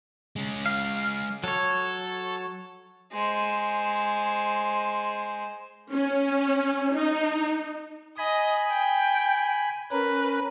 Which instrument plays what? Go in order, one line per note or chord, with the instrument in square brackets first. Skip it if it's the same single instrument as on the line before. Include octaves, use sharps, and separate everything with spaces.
[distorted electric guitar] G#3 C#4
[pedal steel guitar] F5
[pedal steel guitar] F#3 C#5 [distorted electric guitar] A4
[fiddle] G#3 C5
[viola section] C#4
D#4
[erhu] D#5 [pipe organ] G#5 B5
[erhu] G5
[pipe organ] C#4 A#4 [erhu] B4